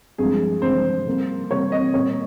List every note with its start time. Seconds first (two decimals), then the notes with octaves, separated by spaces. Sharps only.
0.18 G2 F3 G#3 G#4
0.62 G2 F3 G#3 C5
1.06 C3 G3 A#3
1.51 C3 G3 A#3 C#5
1.72 D#5
1.94 A#2 G3 A#3 C#5